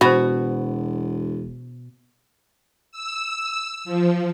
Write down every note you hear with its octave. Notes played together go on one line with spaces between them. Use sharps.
E1 B2 F#4 C5 B5
E6
F3